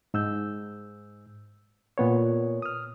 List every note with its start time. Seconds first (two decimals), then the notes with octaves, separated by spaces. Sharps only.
0.14 G#2 E6 G6
1.98 A#2 B3 C#5
2.62 D#6 F6